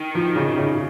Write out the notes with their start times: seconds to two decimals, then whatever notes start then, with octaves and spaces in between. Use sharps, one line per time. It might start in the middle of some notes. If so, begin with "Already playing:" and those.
Already playing: D#3
0.15 F3
0.36 C#3
0.57 C#3